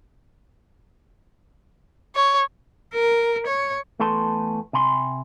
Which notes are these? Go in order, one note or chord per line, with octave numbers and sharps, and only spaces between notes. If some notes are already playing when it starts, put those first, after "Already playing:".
C#5
A#4
C#5
E2 A3 A4 B4 A5 C6
C3 G#5 B5 C6